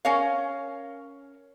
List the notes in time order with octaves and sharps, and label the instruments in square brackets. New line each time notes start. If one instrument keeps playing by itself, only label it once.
[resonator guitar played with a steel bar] C#4 A#4 C#5 F5